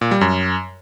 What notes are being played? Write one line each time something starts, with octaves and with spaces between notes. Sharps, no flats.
A#2
G3
F#2